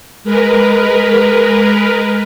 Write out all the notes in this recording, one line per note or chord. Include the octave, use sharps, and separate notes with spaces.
G#3 A#4 B4